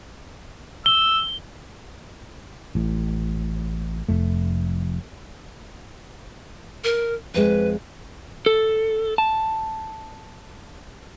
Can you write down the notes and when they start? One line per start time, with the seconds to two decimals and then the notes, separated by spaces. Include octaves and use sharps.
0.86 E6 G7
2.75 A1 A2
4.09 F1 F2 A3
6.84 A#4
7.34 F2 G#3 B4
8.46 A4
9.18 A5